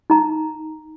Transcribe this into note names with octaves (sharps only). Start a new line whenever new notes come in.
D#4 A#5